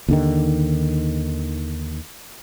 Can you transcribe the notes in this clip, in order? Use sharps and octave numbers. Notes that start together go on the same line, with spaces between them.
D#2 D3 D#3